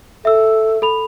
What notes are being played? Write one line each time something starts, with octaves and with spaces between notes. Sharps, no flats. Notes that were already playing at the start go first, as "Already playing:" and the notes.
A4 E5 E6
A4 B5 F7